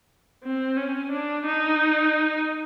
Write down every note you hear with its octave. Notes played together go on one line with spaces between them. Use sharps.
C4
C#4
D4
D#4